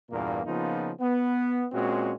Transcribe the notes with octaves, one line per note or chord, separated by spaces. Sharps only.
E2 G2 A#2 A#3
C#3 F3 A#3 B3 D#4 F4
B3
A#2 G#3 C4 C#4 F#4